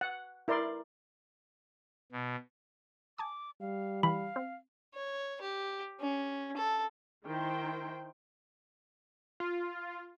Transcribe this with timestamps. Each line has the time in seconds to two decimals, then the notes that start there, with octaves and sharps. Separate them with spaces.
0.01 F#5
0.48 E4 A#4 D5 C6
2.12 B2
3.18 G#5 A5 D6 D#6
3.61 G3 F5
4.03 E3 F5 B5
4.36 C4
4.94 C#5
5.41 G4
6.00 C#4
6.56 A4
7.26 D#3 E4 C5 G5
9.40 F4